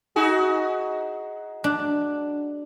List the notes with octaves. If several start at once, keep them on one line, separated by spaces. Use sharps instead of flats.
D#4 F#4 G#4
D4